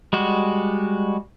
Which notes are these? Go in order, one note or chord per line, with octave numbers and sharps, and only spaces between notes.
G3 G#3 F#4